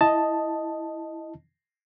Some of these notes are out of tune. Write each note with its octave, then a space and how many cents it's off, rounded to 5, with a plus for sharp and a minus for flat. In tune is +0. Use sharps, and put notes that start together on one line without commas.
E4 +0 D#5 +0 A5 +0